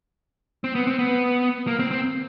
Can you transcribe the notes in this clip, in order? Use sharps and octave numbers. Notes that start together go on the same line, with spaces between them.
C4
B3
C4
B3
A#3
C4
C4